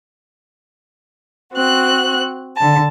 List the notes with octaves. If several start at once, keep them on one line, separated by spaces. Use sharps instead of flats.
C4 F#4 F#6
D3 A5